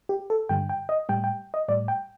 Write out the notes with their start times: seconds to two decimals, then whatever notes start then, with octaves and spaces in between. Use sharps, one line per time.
0.09 G4
0.30 A4
0.49 G2 D3 G3 G5
0.69 G5
0.89 D#5
1.09 A2 G3 G5
1.24 G5
1.54 D#5
1.68 A2 G3 D5
1.88 G5